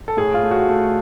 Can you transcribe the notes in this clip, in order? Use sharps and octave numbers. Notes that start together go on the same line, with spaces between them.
A4
A2 G#4
F4
A3
F#4
A3